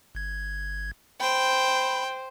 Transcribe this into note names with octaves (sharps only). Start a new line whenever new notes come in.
G1 G#6
C5 G5 B5